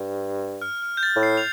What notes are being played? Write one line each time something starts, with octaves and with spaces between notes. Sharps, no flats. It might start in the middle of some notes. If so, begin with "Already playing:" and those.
Already playing: G2
F6
F6
G6
A6
A2
C7
F7